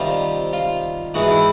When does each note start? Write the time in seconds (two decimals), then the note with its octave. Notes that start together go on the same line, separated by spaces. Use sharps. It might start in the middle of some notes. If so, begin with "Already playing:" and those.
Already playing: C3 D#3 G3 F4
0.53 F4
1.14 G#2 E3 G#3 F#4
1.31 E4